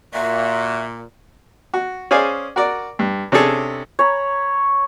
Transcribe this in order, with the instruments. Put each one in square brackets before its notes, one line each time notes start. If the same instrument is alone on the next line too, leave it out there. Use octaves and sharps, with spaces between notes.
[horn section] A#2 [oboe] F#4 [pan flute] E5
[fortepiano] F#4
C#4 G#4 C5 D5 F5 G#5
F#4 A#4 D5
G2
C3 C#4 D4 G#4 A4
[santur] C#5 A#5 B5